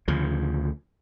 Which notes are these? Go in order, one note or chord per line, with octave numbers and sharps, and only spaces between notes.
D2 C#3 F3